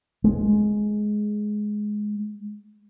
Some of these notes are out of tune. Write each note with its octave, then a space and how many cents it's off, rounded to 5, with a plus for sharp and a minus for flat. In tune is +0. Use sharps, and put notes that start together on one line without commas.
G#3 +10